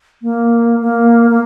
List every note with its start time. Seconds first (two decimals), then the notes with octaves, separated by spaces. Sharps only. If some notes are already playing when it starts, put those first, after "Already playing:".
0.22 A#3
0.81 A#3
1.30 A#3